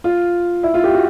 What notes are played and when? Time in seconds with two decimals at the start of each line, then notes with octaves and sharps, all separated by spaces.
0.04 F4
0.63 E4
0.74 F4
0.84 G4
0.94 F#4